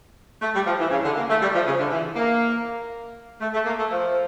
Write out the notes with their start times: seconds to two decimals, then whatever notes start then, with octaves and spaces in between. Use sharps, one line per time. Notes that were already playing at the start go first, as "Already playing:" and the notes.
0.42 A3
0.54 G3
0.66 F3
0.79 E3
0.91 C#3
1.04 D3
1.16 A#3
1.29 A3
1.41 G3
1.54 F3
1.66 C#3
1.79 D3
1.91 E3
2.16 A#3
3.40 A3
3.53 A3
3.65 A#3
3.78 A3
3.91 F3